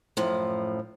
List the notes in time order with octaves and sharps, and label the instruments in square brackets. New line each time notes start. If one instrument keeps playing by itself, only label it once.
[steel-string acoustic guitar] F#2 A2 F3